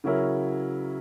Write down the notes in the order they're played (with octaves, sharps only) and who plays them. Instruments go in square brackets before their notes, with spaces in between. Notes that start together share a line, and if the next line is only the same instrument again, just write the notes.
[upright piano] C#3 F#3 C#4 E4 A#4